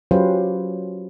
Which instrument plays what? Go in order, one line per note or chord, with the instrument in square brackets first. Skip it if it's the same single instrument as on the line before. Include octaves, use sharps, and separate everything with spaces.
[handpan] F#3 C#4 F4 G4 B4 C5